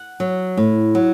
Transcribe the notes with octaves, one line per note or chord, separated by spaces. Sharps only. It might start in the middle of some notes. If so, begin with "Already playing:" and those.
Already playing: F#5
F#3
A2
F#3